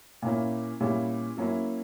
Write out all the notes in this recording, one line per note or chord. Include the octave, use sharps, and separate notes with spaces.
A#2 A#3 C#4 E4
A#2 G3 C#4 E4
F#3 A#3 C#4 E4